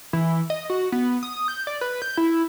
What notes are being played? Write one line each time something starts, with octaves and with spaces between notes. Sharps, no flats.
E3
D#5
F#4
B3
D#6
G6
D5
B4
G6
E4